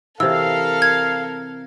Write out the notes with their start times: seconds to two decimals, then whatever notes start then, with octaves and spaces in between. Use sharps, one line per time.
0.20 C3 E3 A4 A#4 F5 E6
0.82 G#6